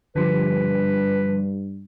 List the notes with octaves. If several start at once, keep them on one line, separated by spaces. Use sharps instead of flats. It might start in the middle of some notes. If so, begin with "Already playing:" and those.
G2 D3 F3 G3 B4